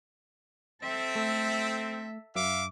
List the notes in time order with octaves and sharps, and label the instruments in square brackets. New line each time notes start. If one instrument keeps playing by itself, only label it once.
[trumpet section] C4 [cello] A4 E5
[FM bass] A3
[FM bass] F#2 [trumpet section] E5 F5 D6